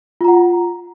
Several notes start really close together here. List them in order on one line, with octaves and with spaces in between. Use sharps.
F4 A#5 F#5